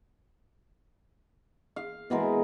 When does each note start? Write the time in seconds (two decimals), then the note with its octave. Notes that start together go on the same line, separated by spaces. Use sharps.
1.76 F5
2.10 B2 E3 G#3 A#4